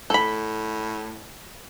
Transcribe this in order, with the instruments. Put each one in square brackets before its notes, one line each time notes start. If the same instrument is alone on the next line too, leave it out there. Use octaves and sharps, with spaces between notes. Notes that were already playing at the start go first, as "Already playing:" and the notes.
[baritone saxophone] A2 [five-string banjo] A4 B5